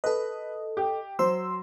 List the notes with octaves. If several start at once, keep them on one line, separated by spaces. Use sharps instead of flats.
A4 B4 D#5
G4
F#3 C5 C6 E6